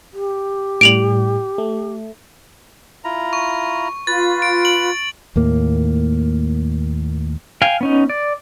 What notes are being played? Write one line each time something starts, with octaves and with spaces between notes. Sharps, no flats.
G4
A2 G3 D7 F7 F#7
A3
E4 F4 A#5
C#6
F4 B4 A6
D7
F#7
D#2 A2 A#3
F5 G5 G#5
B3 C#4 D#4
D5